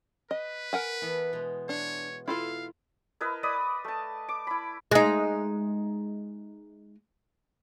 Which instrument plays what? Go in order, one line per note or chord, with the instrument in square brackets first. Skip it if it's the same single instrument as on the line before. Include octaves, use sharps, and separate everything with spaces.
[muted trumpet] B4 [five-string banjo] D#5
[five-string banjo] A#4 F#5 G#5
[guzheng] E3 B3 A4
B2 G#3
[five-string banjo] D4 [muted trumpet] C#5
[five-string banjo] E4 F4 A4 [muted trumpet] F5
[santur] E4 A#4 B4 D#5
D5 D#5 B5 D#6
A3 A5
D6
E4 B5
[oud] G#3 D#4